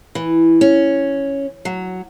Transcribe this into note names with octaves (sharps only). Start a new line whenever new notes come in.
E3
C#4
F#3